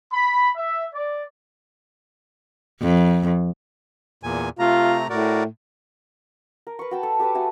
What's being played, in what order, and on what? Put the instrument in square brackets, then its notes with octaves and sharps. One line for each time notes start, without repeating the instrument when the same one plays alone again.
[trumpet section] B5
E5
D5
[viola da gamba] F2
[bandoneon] E2 A#2 G#5
[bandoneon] C3 A3 A#5 [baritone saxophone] F4
[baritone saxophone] A2 [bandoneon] F#4 A#4 D5
[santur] A#4
B4 C#6
F#4 G5 A5
A4
G4 A4 B4 D6
A3 F#4 G#5 D#6